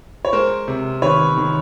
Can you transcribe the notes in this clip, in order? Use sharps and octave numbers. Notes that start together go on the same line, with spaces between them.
C#5
G#3 A#4 C5
C3
D#3 B4 C#5
D#3